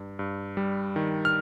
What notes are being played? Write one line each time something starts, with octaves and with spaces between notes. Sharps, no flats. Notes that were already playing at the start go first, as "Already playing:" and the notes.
Already playing: G2
G2
G3
D#3
F6